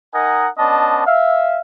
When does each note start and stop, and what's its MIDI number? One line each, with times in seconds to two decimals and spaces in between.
0.14 0.49 63
0.14 0.49 70
0.14 0.49 75
0.14 0.49 78
0.14 0.49 80
0.58 1.06 59
0.58 1.06 61
0.58 1.06 62
0.58 1.06 75
0.58 1.06 81
1.06 1.61 76
1.06 1.61 77